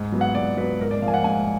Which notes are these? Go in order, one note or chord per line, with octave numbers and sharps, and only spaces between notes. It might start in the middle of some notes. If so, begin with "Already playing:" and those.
Already playing: G#2
F#3 B3
F#5
G#2 D5
F#3 B3 B4
G#2 A#4
D5
F3 A#3 F5 G#5
F#5
G#2 G#5